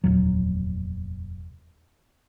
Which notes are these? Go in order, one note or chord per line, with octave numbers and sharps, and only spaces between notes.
F1 D#2 A#2 F#3